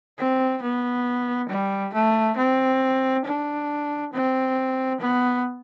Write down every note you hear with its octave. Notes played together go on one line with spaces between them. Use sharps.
C4
B3
G3
A3
C4
D4
C4
B3